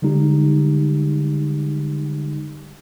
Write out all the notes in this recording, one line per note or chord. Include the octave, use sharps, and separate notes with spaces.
D3 G3 G#3 D#4 G4